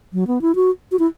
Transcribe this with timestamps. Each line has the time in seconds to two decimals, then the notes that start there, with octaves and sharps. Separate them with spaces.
0.13 F#3
0.27 B3
0.41 E4
0.55 F#4
0.92 F#4
0.99 E4